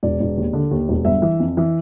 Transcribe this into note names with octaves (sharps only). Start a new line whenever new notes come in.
E1 D5
E1
D#2
D3
D#2
E1
G1 E5
E3
F2
E3